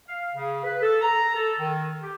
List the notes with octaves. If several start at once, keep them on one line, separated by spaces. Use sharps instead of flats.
F5
C#3
B4
A4
A#5
A4
D#3
G4